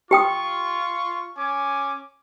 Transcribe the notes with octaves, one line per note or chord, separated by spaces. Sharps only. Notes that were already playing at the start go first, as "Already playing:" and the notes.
F4 G4 G5 C#6 D#6
C#4 G#5 D6